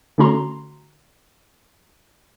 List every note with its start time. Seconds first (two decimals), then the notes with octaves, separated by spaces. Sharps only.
0.18 D3 A3 C#4 F#4 A#5 C6